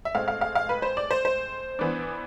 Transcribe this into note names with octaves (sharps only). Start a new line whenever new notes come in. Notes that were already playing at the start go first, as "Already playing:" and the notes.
E5
A2 G#3 C4 F5
F5
F5
F5
B4
C5
D5
C5
C5
E3 B3 D4